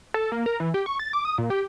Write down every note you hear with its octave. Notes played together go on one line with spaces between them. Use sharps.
A4
A#3
A#4
E3
G4
C#6
A6
D6
D#6
A#2
G4